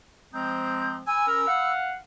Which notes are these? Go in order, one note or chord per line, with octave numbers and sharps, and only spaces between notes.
F3 G#3 C4 A#5 D#6 G6
G#5 B5 E6
C#4 A#4
F5 F#5